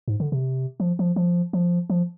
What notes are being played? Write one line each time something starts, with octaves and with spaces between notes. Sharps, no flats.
G#2
D3
C3
F3
F3
F3
F3
F3